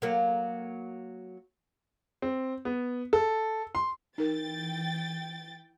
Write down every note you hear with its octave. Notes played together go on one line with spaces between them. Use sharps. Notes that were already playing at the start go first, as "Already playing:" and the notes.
F#3 A#3
C4
B3
A4
C6
E3 D#4 A#4 G5 A6